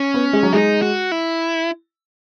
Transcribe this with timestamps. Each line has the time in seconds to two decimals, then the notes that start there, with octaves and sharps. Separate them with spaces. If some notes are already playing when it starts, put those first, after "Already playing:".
Already playing: C#4
0.14 B3
0.33 G#3
0.43 F#3
0.53 G#3 D#4
0.82 F#4
1.12 E4